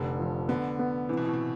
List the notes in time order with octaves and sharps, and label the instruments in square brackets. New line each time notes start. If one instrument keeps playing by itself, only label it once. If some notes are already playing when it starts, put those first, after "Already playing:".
Already playing: [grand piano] F1 [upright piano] D3
[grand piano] F3
[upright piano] D3 [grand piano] B3
[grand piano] B3
[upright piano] C3 [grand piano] E3
[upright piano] B2
A2
B2